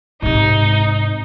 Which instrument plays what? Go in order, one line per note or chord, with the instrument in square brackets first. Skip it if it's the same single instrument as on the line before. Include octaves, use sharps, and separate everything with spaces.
[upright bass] G#2 C3 [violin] D#4